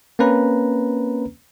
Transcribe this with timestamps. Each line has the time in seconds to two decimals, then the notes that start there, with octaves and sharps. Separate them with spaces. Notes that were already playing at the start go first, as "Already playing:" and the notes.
0.19 A#3 C4 C#4 B4 A#5